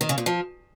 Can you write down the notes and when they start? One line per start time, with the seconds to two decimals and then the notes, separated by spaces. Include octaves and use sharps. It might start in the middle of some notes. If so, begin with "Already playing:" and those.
0.01 D#3
0.09 C#3
0.18 A#2
0.26 F3